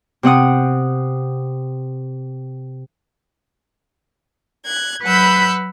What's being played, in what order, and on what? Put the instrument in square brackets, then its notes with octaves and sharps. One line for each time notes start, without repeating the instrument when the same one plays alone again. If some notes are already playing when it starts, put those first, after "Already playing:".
[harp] C3 C4 F#5 D#6
[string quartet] F#6 G#6
F#3 B4 F#5 B5 E6 G6